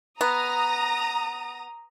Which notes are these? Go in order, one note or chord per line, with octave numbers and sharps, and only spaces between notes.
B3 A#5 D#6